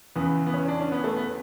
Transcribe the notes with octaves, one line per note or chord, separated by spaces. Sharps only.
E2 C#3 E3 B3
B3
C#4
D4
C#4
B3
A3
B3